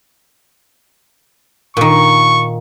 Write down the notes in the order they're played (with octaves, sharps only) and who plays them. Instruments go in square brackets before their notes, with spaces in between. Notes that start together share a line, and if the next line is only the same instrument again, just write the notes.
[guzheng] A#2 D#3 [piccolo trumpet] C#6